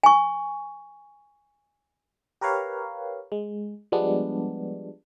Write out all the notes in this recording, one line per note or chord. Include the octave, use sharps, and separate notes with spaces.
G#5 C#6
G4 A#4 B4 C#5 F5
G#3
F3 G3 G#3 B3 D4